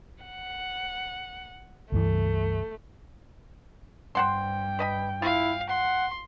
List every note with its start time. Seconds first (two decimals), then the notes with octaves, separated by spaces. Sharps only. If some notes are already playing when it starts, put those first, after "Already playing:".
0.24 F#5
1.92 C#2 G2 E3 A3
4.15 G2 C5 F#5 G5 C6
4.79 B4 D#5 B5
5.22 E4 F4 F5
5.69 F#5 C6